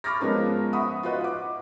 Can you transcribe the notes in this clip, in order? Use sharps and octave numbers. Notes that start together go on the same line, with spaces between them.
B5 C#6 D6 F6 A6 A#6
F3 G#3 B3 C#4 A#4
E5 F#5 B5 C#6 D#6
F4 F#4 B4 D#5
F#5 D6